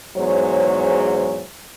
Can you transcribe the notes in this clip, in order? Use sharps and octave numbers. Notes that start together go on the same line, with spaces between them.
E2 G#2 F#3 C5 C#5